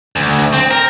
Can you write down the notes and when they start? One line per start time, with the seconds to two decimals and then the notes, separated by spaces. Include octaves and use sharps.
0.16 D2
0.54 C4
0.71 A#4